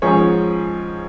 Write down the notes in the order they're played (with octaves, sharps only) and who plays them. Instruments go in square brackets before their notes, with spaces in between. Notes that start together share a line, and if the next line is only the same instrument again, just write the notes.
[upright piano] G#2 F3 C#4 G#4 C#5